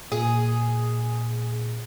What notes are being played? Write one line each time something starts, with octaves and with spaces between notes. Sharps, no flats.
A#2 G#4